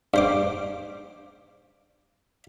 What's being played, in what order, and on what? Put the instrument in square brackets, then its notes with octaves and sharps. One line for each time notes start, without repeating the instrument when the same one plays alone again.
[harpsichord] G2 C5 D6